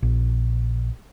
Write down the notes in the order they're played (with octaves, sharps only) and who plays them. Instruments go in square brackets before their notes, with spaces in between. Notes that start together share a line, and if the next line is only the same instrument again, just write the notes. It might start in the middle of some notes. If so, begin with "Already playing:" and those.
[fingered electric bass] A#1